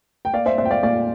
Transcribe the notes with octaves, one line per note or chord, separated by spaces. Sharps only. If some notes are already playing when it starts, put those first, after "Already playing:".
G5
A#3 D5 F5
C5 E5
A#2 C5 E5
G5
D5 F5
A#2 D5 F5